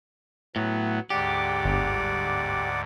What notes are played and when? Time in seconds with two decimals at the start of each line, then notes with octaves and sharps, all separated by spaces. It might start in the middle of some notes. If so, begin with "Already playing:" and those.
0.56 A2 F#3 B3
1.10 D2 G#2 G4 D5 F#5 D6
1.65 G1